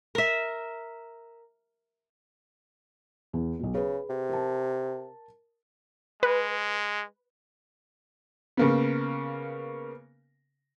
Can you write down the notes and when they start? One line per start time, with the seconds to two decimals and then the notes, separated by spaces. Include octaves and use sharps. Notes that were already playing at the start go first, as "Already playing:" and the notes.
0.15 A#4 E5
3.33 E2
3.60 B1 B2
3.74 C#3 G#4 B4
4.09 C3
4.29 A#4 A5
6.23 G#3 B4
8.57 C#3 A#3 B3